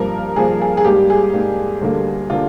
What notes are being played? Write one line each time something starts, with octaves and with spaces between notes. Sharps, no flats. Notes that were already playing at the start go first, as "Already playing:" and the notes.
Already playing: G2 F3 A#3 A#4
G2 F3 A#3 G#4
G#4
G#4
G#2 G3 A#3 G4
G#4
G#2 G3 A#3
D2 D3 G3 A#3
D3 G3 A#3 F4